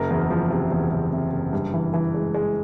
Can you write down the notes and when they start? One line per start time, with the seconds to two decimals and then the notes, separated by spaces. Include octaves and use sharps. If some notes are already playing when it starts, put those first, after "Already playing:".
Already playing: F#1 A#4
0.10 E2
0.30 F3
0.50 C3
0.71 E2
0.91 F#1
1.12 C3
1.32 F#1
1.53 G2
1.74 E3
1.94 E3
2.14 G#3
2.34 G#3